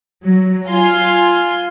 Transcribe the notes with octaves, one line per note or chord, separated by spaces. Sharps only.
F#3
F4 F5 G#5 C6